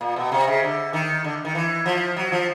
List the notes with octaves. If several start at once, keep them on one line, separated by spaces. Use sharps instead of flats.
A#2
B2
C3
C#3
D3
D#3
D3
D#3
E3
F3
F#3
F3